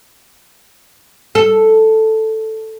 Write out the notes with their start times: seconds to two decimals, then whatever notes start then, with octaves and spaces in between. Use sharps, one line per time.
1.35 A4